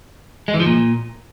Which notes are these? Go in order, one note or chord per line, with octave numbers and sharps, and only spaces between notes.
G#3
E3
F3
A#2